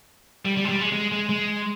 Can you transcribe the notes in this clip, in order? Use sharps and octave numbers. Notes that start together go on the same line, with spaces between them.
G3
G3
G#3
G3
G#3
G#3
G#3
G#3